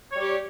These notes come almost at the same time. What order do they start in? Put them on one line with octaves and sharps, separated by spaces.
C#5 G3 G4